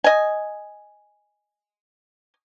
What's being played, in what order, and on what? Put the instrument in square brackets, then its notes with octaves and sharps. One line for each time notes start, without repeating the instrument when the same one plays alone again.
[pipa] D#5 G#5